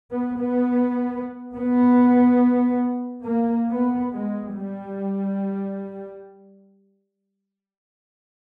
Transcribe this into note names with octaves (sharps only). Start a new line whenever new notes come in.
B3
B3
B3
A#3
B3
G#3
G3